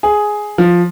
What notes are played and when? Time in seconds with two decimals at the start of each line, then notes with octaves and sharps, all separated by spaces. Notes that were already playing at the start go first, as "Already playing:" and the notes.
0.03 G#4
0.58 F3